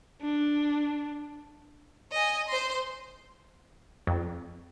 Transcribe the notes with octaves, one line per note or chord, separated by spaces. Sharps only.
D4
D#5 G#5
C5 C6
F2